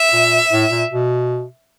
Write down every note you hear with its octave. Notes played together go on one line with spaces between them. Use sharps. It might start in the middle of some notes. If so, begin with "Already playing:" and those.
Already playing: E5
A#2
A2
A#2
B2